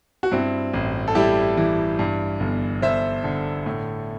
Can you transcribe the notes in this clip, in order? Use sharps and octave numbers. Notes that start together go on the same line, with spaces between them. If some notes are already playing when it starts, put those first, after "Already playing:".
F#4
G2 C4 E4
A1
A4
G3 E4 G4
E3
G2
G1
G1 C5 E5
D3
A2